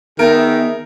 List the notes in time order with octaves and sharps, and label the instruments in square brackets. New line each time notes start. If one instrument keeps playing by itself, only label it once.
[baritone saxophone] D#3 [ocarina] B3 [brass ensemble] G#4 E5 [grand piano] A#4